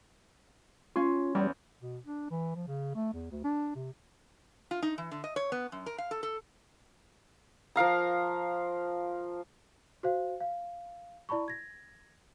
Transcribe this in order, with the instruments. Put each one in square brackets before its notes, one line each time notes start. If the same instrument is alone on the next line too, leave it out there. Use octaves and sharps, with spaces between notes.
[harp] C#4 C6 [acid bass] F4
[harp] E2 [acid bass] G3
[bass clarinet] B2
D4
E3
F3
C#3
A3
E2
D2
D4
C3
[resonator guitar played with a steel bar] F4
D#4
E3
D3
D#5
C#5
B3
F#2
A#4
F5
A4
A4
[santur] F3 A#4 F5 A#5
[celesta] F#4 C5 F5
F5
E4 D5 A5 B5 C#6
G#6 A#6